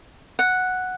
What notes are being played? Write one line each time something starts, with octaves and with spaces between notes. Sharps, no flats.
F#5